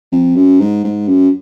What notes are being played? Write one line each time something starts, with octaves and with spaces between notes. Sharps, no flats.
F2
F#2
G#2
G#2
F#2